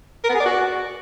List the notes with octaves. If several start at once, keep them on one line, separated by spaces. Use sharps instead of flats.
A#4
B3
G#4
D5
F#4